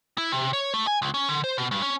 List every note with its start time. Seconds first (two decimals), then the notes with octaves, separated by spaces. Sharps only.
0.18 E4
0.32 C3
0.53 C#5
0.74 A3
0.87 G#5
1.02 C#2
1.14 C#4
1.29 D3
1.44 C5
1.58 B2
1.71 G2
1.83 C#4